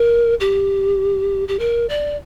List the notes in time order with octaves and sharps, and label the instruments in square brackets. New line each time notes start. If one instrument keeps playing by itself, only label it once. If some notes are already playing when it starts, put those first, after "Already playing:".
Already playing: [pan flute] A#4
G4
G4
A#4
D5